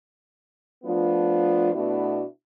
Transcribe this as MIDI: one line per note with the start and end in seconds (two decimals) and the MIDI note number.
0.84 1.71 53
0.84 1.71 57
0.84 1.71 59
0.84 1.71 62
0.84 1.71 65
1.73 2.22 47
1.73 2.22 57
1.73 2.22 59
1.73 2.22 62
1.73 2.22 64
1.73 2.22 66